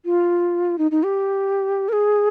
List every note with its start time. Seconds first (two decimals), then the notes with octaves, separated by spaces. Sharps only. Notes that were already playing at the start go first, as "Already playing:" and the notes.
0.05 F4
0.78 D#4
0.91 D#4
1.03 G4
1.89 A#4
1.93 G#4